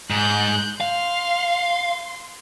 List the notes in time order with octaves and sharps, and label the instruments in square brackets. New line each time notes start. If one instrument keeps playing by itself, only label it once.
[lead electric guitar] G#2 [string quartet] F#6 G6
[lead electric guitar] F5 [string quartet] C6